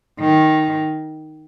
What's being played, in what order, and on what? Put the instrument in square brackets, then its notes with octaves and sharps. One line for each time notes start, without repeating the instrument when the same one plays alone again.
[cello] D#3